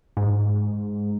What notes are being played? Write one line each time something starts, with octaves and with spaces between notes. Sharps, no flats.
G#2